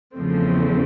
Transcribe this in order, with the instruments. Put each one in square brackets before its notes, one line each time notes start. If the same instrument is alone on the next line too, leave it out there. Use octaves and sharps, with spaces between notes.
[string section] E2 C#3 F3 A3 C4